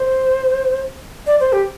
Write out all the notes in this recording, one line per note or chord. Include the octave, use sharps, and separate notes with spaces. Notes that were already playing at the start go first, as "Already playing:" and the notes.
Already playing: C5
D5
C5
G4